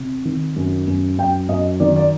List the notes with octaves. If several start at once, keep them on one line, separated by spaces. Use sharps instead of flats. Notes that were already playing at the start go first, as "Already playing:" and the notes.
Already playing: C3
D#3
F#2
F#2
F#2 G5
F#2 D#5
D#3 D5
D5